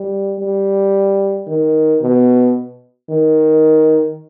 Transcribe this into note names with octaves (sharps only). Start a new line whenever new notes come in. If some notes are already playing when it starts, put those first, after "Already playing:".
Already playing: G3
G3
D#3
B2
D#3